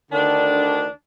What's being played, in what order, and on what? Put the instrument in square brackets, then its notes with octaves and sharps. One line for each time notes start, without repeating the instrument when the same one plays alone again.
[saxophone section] D2 D3 D#3 D4